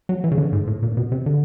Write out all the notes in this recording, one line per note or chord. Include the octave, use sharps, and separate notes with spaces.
F#3
E3
C#3
D3
G#2
A2
A#2
B2
C3
D3